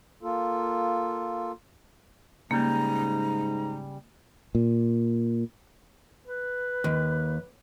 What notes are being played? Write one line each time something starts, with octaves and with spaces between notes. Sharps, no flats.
A#3 F4 A4
G#2 C#3 G3 A#3 A#5
A#2
B4
D#2